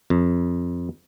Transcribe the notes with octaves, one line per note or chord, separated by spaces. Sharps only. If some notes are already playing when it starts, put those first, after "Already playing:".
F2